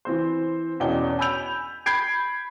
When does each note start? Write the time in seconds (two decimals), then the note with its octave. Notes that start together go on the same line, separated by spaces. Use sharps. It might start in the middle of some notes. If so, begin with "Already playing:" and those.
0.05 E3 C4 C5
0.80 E2 B2 C#4 D4 G5 G7
1.19 G#5 B5 E6 G6 F7
1.86 B5 G6 G#6 C7 D7